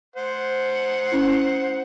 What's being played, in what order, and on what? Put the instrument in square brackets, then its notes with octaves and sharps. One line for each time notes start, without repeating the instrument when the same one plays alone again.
[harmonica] C5 F#5
[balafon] C#4 E4